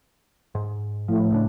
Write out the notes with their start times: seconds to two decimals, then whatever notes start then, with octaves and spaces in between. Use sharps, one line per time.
0.55 G#2
1.08 A2 F3
1.30 C#2 C#3 D4